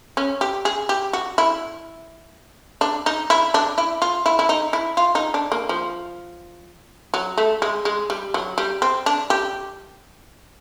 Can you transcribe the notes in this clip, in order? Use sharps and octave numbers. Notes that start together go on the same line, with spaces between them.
C#4
G4
G#4
G4
F#4
E4
D4
D#4
E4
D4
E4
F4
E4
E4
D#4
E4
F4
D#4
D4
A#3
F3
F#3
A3
G#3
G#3
G3
F#3
G3
C4
D4
G4